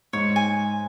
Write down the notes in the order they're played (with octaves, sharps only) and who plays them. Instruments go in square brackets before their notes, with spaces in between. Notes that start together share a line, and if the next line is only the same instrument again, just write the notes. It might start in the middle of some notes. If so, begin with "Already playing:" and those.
[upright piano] G#2 [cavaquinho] C#5
[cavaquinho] G#5